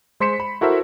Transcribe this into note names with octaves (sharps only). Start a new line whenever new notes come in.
G#3 C5 C6 B6 C#7 E7
B5
E4 F#4 A4 A#4 C5 E5